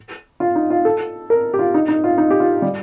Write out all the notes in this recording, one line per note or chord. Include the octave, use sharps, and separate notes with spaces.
F4
D#4
F4
A4
A#4
G4
F4
D#4
D#4
F4
D#4
G4
F4
G3